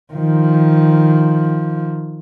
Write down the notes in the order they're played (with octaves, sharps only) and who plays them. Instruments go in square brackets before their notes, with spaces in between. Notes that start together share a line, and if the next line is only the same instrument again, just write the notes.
[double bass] D#3 F3